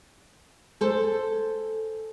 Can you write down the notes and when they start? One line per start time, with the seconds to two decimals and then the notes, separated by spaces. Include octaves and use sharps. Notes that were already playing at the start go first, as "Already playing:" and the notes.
0.81 G#4 A4 C5